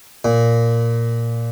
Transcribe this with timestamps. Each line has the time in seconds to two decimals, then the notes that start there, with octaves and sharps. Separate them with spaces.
0.25 A#2